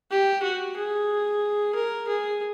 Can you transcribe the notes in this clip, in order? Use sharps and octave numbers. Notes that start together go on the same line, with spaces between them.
G4
F#4
G#4
A#4
G#4